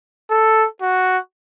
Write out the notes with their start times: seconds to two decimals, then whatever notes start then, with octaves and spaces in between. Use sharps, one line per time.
0.30 A4
0.82 F#4